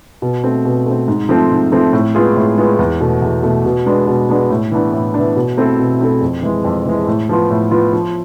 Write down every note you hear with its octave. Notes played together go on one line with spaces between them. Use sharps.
B2
A3 C4
B2
A3 C4
G#2
F3 A3 C4
G#2
F3 A3 C4
A2
G#3 B3 F4 G#4
A2
G#3 B3 F4 G#4
E2
B2 A3
E2
B2 A3
B2
G#3 B3 D4
B2
G#3 B3 D4
A2
E3 B3 D4
A2
E3 B3 D4
B2
A3 C4 E4 A4
B2
A3 C4 E4 A4
F2
E3 G#3
F2
E3 G#3
A2
F3 B3 F4
A2
F3 B3 F4
F3